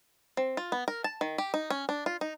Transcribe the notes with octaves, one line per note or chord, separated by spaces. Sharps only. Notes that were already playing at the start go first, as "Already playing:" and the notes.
C4
F4
B3
A#4
A5
D#3
G4
D#4
C#4
D4
F4
D#4